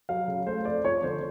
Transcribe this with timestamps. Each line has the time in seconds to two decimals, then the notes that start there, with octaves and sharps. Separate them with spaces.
0.09 F#3 F5
0.28 C#3
0.47 A3 C5
0.65 F2 D5
0.85 F3 C#5
1.03 D3 C5